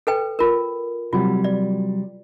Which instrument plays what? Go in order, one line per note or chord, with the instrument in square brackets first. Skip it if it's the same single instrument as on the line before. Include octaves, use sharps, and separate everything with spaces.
[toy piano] A4 B4 G5
F4 A#4
[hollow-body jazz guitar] C3 F#3 G3 [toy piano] F4
[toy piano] D5